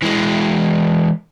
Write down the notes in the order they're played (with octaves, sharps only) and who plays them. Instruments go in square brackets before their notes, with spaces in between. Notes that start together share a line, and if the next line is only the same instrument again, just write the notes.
[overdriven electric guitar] E3 G#3